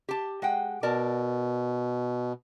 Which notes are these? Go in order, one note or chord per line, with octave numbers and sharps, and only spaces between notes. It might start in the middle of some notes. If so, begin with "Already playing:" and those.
G4 A5
G#3 F#5 G5
B2 A#4 D5 A5